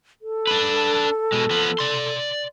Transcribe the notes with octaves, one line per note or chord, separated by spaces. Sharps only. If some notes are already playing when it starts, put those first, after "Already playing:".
A4
D4 B4
B2 G#3
F3 B3
D5 C6